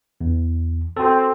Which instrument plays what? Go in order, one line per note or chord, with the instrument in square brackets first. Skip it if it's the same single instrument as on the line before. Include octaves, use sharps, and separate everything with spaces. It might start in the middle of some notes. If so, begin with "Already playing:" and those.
[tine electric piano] E2
[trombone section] C4 [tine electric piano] F#4 A4